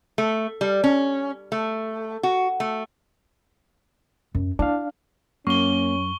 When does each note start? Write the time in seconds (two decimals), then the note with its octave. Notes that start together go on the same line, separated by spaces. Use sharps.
0.18 A3
0.61 G3
0.84 C#4
1.52 A3
2.23 F#4
2.60 A3
4.35 F#2
4.59 D4 E4 F5
5.47 F#2 A#3 C#4 C#6 G7